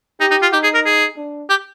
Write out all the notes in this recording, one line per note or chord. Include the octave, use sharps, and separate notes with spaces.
D#4 G4
D#4
F4
D#4 G4
G#4
A#4
G#4
D4
G4